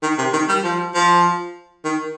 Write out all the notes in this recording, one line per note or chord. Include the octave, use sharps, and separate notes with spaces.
D#3
C3
D#3
G3
F3
F3
D#3